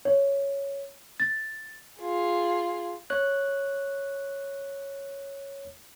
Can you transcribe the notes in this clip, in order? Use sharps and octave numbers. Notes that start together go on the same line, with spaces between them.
C#5
A6
F4 G#4
C#5 F#6